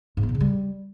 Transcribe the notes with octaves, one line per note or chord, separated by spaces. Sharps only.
G#2
B3
A#2
C#3
G3